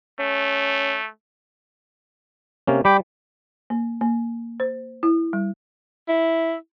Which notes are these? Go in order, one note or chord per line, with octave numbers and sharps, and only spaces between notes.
A3 C#4
C3 A#3 C#4
G3 G5 B5 D6
A#3
A#3
C5
E4
G3
E4